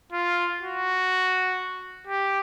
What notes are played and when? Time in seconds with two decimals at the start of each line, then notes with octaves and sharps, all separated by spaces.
0.12 F4
0.61 F#4
2.07 G4